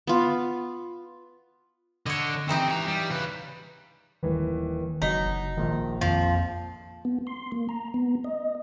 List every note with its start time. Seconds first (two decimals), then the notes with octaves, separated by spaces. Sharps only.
0.07 B3 F4
2.06 D3 C#5 D#5
2.49 E3 C4 D#4 G4
2.69 C#4 A#5
2.88 G3
3.10 C#3 B4
4.23 D#1 D#3 E3 B4
5.02 F#1 F#3 D#4 B6
5.26 F#1
5.57 A#1 A#2 D#3
6.01 F2 F3
7.05 B3
7.27 C6
7.52 A#3
7.69 A#5
7.94 B3
8.24 D#5